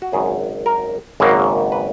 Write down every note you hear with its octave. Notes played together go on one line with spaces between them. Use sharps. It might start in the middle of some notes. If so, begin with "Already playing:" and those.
F#4
G#1 F#2 C#3 G#4
A#4
G#1 F#2 C#3 F#3 A#3
B4